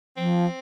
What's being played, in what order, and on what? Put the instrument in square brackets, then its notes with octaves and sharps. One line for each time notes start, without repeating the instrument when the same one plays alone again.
[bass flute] F3 [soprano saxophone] C4